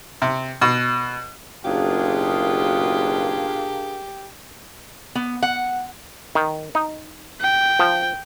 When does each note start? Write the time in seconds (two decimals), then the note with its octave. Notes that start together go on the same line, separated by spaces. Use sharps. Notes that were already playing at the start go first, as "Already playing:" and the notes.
0.22 C3
0.61 B2
1.65 F#1 B2 A#3 D4 F4 G4 G#4
5.15 B3
5.43 F#5
6.35 D#3
6.75 D#4
7.41 G5
7.79 F3